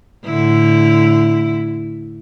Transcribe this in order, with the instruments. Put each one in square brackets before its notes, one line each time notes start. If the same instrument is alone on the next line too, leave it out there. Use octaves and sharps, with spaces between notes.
[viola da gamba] A2 D3 E4